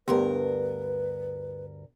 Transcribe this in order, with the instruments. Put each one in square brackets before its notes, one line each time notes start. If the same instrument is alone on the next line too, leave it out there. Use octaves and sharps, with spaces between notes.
[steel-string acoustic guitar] D2 G2 A#4 [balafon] B3 G4 C6 [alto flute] B4